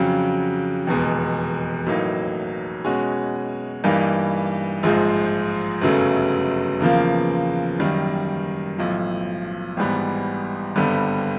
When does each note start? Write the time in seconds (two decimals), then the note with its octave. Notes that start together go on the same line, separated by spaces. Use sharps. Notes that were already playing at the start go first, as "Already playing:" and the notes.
Already playing: F2 C#3 F#3
0.87 F1 E2 B2 G#3
1.87 A1 A2 F#3 A#3 D#4
2.85 B2 G#3 C#4 F#4
3.84 G2 E3 G3 A#3 D#4
4.83 A#1 G#2 F3 G#3
5.81 G1 F#2 C#3 F#3 A3
6.80 E2 C#3 F3 A#3
7.80 F#2 D#3 G3 A#3
8.78 B1 A2 F3
9.77 G#1 G#2 E3 G3 B3
10.76 G#1 G2 D3 G3 B3